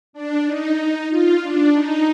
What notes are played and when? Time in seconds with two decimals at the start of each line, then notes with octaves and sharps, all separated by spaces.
0.13 D4
0.46 D#4
1.10 F4
1.42 D4
1.74 D#4